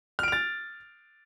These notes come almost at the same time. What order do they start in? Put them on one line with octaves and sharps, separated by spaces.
F6 D7 F7 A6